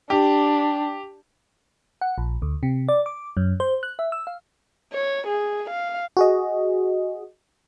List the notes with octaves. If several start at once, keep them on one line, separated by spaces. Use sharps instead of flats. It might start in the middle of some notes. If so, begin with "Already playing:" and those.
D4 G4
F#5
A#1
D2
C3
D5
D6
F#2
C5
F#6
E5
E6
F5
C#5
G#4
F5
F#4 G#4 D#5